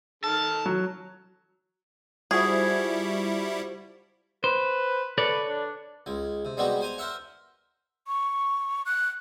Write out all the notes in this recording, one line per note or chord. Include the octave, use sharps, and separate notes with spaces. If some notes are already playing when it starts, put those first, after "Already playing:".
D#3 A4 A5 F6
F#3
F3 G3 E4 F#4 G#4
B4 C5
A4 B4 C#5 D5
D4
C#2 G#3
C3
G3 G#3 B3 C4 F#4 G4
C5 G#5 A#5
A#4 C5 E5 F#5
C#6
F#6